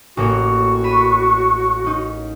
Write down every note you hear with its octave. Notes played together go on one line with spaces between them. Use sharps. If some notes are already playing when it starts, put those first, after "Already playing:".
A1 A#3 F#4 C#5
B5 D#7 E7
C#4 D#4